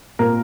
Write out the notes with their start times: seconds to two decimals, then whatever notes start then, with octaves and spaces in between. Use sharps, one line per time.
0.19 A#2 A#4